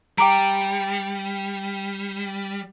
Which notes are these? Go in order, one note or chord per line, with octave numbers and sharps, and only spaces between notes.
G3 G5 A#5 D6 D7